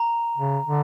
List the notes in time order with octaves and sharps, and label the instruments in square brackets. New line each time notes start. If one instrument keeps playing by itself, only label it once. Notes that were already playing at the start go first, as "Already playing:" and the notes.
Already playing: [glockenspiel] A#5
[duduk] C#3
D3